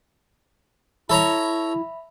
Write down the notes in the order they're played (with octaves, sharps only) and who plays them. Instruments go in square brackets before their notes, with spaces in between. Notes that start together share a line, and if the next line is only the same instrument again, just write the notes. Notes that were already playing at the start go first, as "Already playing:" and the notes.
[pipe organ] E4 [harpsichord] A4 C#5 A#5 [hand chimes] E5 B5